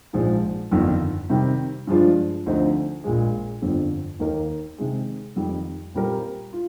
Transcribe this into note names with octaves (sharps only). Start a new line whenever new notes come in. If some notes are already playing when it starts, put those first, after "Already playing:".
A#1 G#2 F3 G#3
G1 F2 D#3
C3 D#3 G3
G2 F3 G#3 D4 F4
D2 D3 F3 C4 D#4
A#1 A#2 G#3
G1 F2 D3 F3
D#2 D#3 A#3 D#4 A#4
C3 D#3 G#3
F2 D#3 G3
A#2 G3 C4 G4 A#4
F4